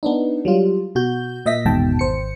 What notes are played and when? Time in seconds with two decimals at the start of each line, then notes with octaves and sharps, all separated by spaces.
0.03 B3 D4 D#4
0.45 F#3 G3 F4
0.95 B2 F#4 G6
1.46 A#2 D#5 E5 A#6 B6
1.65 G#1 E2 G#2 B2 G5 A5
1.99 G#1 C5 C#7